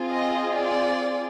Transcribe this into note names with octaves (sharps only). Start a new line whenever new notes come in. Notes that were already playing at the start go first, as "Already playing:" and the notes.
Already playing: C4 F4 G#4
D#5
D5